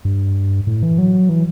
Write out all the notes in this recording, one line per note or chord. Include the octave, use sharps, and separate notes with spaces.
G2
A2
E3
F#3
E3